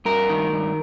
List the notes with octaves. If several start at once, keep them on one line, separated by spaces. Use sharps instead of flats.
G2 A#4
D#3
G2